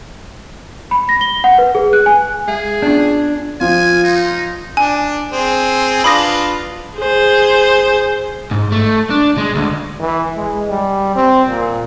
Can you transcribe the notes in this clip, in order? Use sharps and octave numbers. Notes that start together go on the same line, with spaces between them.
B5
A#6
G7
F#5
B4
G#4
F#6
G#5
G#3 G#4 E5
B3 C#4 D4 F4
F3 F4 G#5
D#4
D4 G#5
C4 G#4
D4 F4 B4 B5 D#6 A#6
G#4 C5
G#2
A3
D4
G#3
D2
E3
G#3
G3
C4
A#2